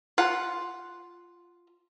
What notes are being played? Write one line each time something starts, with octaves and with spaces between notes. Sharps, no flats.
F4 F#5